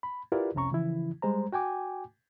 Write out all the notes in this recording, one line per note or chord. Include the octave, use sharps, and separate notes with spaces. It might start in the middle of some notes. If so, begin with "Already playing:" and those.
B5
E4 F4 G4 A#4 B4 D5
C2 F2 C3 C#4 A#5 C#6
C#3 E3 F3 E4
G3 G#3 C5 A#5
F#4 G5 G#5 D6